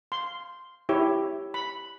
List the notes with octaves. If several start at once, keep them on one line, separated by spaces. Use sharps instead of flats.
C6
E4 G4 C#5
B5